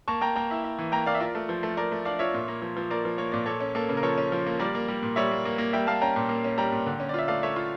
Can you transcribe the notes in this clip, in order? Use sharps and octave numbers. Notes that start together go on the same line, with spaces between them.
A#3 A5 C#6
A#3 G5 A#5
A#3 G5 A#5
E4
E4
E3
A#3 G5 A#5
A#3 D5 F5
E5
F4 A#4 D5
A3
F3
A3
A3 A#4 D5
A3
D4 D5 F5
F4 C#5 E5
A#2
A#3
F3
F3
A#3 A#4 D5
F3
A#3 C#5
A#2 D5
A#3 A4 C#5
C#4
A#3 A4
C#3
A#4
F3 A4 C#5
C#4
F3
A#3
G3 A#4 D5
A#3
G3
A#2
G3 C#5 E5
A#3
A#3
A#3
G3 E5 G5
A#3 F5 A5
C#4 G5 A#5
A#2
A#3
C#4
G3 G5 A#5
A#2
D3
C#4
D5
F4 E5
A3 D5 F5
A3 C#5 E5
F4